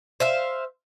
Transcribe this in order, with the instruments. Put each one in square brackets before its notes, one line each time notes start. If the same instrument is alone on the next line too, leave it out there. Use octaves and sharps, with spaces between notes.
[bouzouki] C5 E5 F5